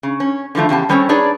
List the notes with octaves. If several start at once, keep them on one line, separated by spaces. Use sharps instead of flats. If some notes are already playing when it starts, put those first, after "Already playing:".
C#3
C#4
D3 E3 F3 A3
E2 C#3 G4 A5
F#3 G3 C4 C#4 A4 C#5
D4 D#4 G#4 B4 C#5 D5